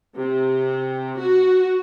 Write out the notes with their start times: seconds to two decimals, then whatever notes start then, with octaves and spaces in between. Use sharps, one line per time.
0.18 C3
1.20 F#4